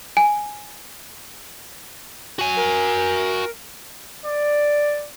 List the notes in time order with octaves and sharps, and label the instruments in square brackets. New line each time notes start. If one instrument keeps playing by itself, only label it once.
[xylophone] G#5
[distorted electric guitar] F#4 G#5
[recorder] A#4
[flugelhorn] D5